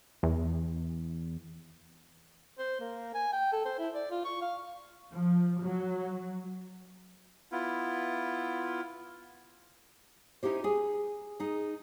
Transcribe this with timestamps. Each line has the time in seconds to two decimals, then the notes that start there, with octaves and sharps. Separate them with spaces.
0.23 E2
2.59 C5
2.81 A#3
3.15 G#5
3.33 G5
3.52 A4
3.65 C5
3.79 E4
3.95 D5
4.11 F4
4.25 C#6
4.42 F5
5.13 F3
5.63 F#3
7.52 B3 E4 F4
10.43 C#4 D#4 E4 G4 C5
10.64 G#4 G#5
11.40 D#4 G#4